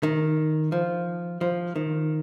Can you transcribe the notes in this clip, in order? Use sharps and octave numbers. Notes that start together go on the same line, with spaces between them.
D#3
F3
F3
D#3